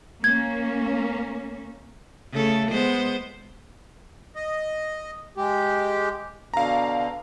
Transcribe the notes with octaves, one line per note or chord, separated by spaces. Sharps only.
A#3 C#4 G#6
C#3 A3 A4
G#3 B3 C5
D#5
G#3 G4
B2 D3 F5 A#5